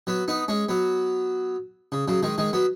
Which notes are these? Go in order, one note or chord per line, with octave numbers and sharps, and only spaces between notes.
F#3 B3
B3 D#4
G#3 C#4
F#3 B3
C#3
C#3 F#3
D#3 G#3
D#3 G#3
F#3 B3